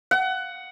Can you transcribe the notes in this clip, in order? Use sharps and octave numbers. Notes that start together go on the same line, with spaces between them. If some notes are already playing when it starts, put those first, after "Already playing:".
F#5